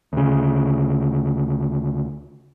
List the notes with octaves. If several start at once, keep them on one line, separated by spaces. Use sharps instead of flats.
D2 C#3